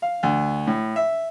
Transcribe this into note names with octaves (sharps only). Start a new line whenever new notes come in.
F5
D2
A2
E5